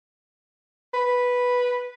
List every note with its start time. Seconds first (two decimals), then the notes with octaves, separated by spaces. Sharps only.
0.94 B4